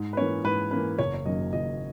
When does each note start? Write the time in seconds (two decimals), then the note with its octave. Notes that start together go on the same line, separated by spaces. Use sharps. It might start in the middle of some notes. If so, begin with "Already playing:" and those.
Already playing: G#2
0.13 B4
0.17 E3 A#3 C#4 C#5
0.44 G#2 B4
0.71 E3 A#3 C#4 B4
0.99 F#1 C#5
1.14 C#5
1.26 F#2 D#3 F#3 A#3 D#5
1.53 F#1 D#5